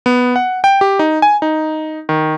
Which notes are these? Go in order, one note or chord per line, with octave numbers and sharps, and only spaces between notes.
B3
F#5
G5
G4
D#4
G#5
D#4
D#3